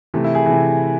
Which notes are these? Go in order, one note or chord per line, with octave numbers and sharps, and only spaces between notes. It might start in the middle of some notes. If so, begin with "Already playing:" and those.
C3 E3 A3
E4
G#4
C3 E3 G#4